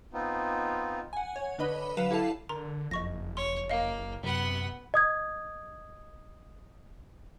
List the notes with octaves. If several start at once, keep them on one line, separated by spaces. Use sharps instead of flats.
B3 C4 D#4 F4
F#5 G#5
C#5
D3 D4 B4 D#5 B5
F#3 B4 F5 F#5 E7 F7
E4 G4 A4 F5 A5 C7
D3 A#4 A#5 C6
F#1 F2 D#5 C#6 A#6
C#5 C6
A#3 D#5 F5
F#2 C3 B3 F#5
D#5 D#6 G#6